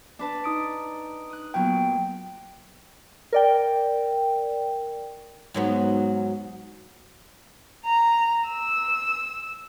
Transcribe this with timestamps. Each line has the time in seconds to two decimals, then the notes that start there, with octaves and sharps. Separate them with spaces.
0.19 D4 B4 A5
0.44 D#4 D#6 D7
1.30 D#6 F#6
1.54 A#2 F#3 B3 G5
3.33 A#4 D5 G5
5.54 G#2 F#3 B3
7.86 A#5
8.49 E6